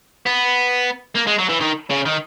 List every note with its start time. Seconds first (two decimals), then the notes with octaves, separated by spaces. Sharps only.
0.26 B3
1.15 A#3
1.27 G#3
1.39 F#3
1.49 E3
1.61 D#3
1.90 C#3
2.06 D#3